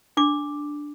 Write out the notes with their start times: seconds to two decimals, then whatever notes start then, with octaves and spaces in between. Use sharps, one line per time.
0.17 D4 D6